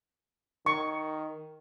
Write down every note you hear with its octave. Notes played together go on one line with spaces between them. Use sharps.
D#3 C#6